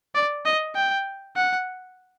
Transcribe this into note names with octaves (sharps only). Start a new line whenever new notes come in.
D5
D#5
G5
F#5